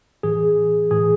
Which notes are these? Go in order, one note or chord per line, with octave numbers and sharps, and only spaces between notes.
A2 E3 G#4
A2 E3 G#4